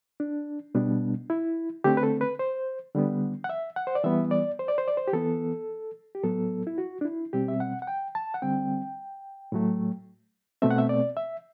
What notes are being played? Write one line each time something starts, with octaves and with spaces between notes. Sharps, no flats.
D4
B2 G3 B3 D4
E4
D3 A3 C4 G4
B4
A4
B4
C5
D3 G3 B3
F#5
E5
F#5
C5
D5
E3 G3 B3 E5
D5
C5
D5
C5
D5
C5
G4
E3 B3 A4
G4
A2 F#3 B3 A4
E4
F#4
D4
E4
B2 G3 C4 G4
E5
F#5
F#5
G5
A5
F#5
D3 G3 C4 G5
A2 F#3 A3
B2 A3 C4 E5
F#5
E5
D5
E5